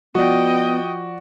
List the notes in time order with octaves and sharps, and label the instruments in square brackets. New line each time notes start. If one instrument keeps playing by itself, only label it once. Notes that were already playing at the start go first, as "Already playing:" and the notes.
[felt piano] F3 [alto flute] B3 [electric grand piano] F#4 D5 [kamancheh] D#5 G5